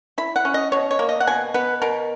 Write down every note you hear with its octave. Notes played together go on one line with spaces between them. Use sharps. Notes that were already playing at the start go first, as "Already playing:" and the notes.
E4 B5
F#5
C#4
D#5
B2 C#5
C#5
A#3
D#5
F#5
B2 G#5
B3 B4
B2 A#4